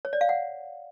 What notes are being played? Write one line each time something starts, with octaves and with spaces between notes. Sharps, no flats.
C#5
D5
F5
F#5